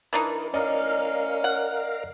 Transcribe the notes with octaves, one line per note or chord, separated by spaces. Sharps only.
E3 D4 D#4 A#4
C#4 A#4 D5 D#5 F5 A#5
F#5